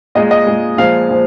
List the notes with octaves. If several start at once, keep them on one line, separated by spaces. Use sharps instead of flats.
A#2 G#3 D#5
D#5
A#2 G#3
A#2 F3 G#3 F5
A#2 F3